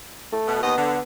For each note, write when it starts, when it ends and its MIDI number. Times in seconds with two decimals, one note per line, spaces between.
0.32 0.58 57
0.47 0.62 47
0.63 0.77 39
0.63 1.01 59
0.63 0.77 75
0.78 1.00 50